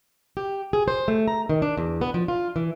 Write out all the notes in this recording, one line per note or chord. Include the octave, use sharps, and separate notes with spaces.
G4
G#4
C5
A3
A#5
D#3
D4
E2
B3
F3
F4
E3